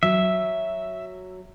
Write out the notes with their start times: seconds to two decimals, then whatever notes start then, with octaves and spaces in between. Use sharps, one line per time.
0.03 F#3 E5